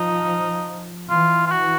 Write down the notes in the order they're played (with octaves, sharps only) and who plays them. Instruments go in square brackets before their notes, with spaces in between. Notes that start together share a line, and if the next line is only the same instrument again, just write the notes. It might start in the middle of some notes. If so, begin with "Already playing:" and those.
Already playing: [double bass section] F3 [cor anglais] D#4
[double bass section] E3 [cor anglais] F4
[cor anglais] F4
F#4